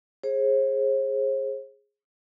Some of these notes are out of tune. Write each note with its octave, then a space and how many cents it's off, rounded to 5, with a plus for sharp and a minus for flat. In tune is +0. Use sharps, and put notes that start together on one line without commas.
G#4 +0 C5 +45